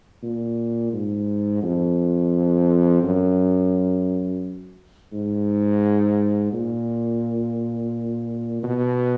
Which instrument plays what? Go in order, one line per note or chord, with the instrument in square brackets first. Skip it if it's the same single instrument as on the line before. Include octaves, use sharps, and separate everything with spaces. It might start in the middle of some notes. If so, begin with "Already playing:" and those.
[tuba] A#2
G#2
F2
F#2
G#2
A#2
B2